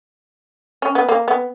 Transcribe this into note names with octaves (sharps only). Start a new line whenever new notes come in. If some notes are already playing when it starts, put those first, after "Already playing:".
C#4
B3
A#3
B3